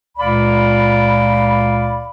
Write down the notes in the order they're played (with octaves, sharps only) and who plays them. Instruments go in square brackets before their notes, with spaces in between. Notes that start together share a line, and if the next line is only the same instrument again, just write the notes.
[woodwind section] C#2 A#2 D5 F5 B5